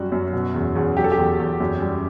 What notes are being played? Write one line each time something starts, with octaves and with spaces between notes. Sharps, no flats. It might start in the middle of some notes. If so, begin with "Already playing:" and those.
Already playing: F#2 G3 F#4
F#2
B2
E2
E2
F#3 G4
A4
G4
E2
E2
F#2
G3